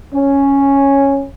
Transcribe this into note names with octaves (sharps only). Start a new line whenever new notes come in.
C#4